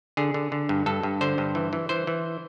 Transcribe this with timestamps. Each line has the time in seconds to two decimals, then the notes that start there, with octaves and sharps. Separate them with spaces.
0.17 D3 G#4
0.34 D3
0.52 D3
0.69 G2
0.86 G2 A4
1.03 G2
1.21 D3 C5
1.38 G2
1.55 E3
1.73 E3
1.89 E3 C5
2.07 E3